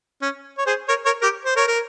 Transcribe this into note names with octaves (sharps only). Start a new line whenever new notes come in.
C#4
C#5
G#4 C5
A#4 C#5
A#4 C#5
G4 A#4
C5
A#4 C#5
A#4